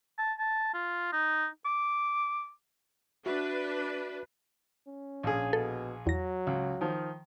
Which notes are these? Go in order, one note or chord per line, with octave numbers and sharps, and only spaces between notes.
A5
A5
F4
D#4
D6
D4 F#4 B4 E5
C#4
A#1 G#4
B2 A4
E2 F#3 A#6
C#2
D#3 F3